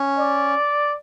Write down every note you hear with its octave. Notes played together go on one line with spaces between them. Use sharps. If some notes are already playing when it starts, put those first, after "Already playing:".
Already playing: C#4
D5